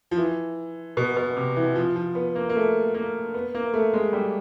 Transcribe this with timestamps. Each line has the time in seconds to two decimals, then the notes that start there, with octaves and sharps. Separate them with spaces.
0.11 F3
0.18 E3
0.97 B2
1.16 B2
1.37 C3
1.56 E3
1.75 F3
1.96 F3
2.15 B3
2.35 A#3
2.49 A#3
2.56 A3
2.94 A#3
3.34 B3
3.55 A#3
3.74 A3
3.93 G#3
4.13 G3